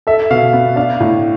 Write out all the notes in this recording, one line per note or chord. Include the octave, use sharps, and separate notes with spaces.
A4 E5
B2 F5
B3
D4 F5
A2